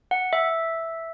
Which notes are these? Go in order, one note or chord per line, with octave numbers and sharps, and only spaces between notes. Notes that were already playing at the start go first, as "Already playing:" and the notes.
F#5
E5